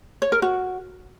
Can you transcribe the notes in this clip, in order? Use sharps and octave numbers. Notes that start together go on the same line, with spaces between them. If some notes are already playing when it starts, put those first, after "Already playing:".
C#5
A#4
F#4